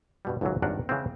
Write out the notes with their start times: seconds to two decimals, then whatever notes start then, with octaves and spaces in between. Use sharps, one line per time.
0.25 G2 B2 G3
0.41 G#1 C#2 F#2 B2 E3 F#3
0.62 G#1 G2 D4 A#4 C#5 F#5
0.89 C#3 E3 G#3 B3 C4